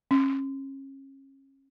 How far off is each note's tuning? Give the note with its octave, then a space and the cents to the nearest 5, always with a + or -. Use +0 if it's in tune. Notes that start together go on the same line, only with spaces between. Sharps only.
C#4 -30